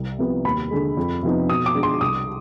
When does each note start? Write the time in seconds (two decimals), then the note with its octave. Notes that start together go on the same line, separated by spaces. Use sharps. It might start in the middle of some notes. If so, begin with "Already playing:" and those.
Already playing: C2
0.19 C3 F3 B3
0.45 D#2 B5
0.71 D3 G#3
0.97 F2
1.23 C3 F3 B3 D#4
1.49 B2 D#6
1.66 D6
1.75 G#3 D4
1.83 C6
2.01 C2 D#6